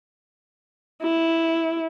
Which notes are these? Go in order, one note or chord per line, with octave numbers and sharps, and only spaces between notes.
E4